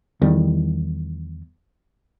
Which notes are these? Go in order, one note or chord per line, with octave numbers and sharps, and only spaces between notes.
E2 D#3 G3